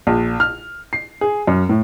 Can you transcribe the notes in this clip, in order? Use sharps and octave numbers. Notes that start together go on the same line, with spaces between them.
A#1
F6
C7
G#4
F#2
A2